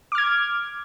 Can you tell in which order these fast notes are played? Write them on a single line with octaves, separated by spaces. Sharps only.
D6 F6 G#6